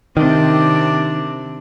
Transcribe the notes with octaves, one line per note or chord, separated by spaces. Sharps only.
C3 D#3 C4 D4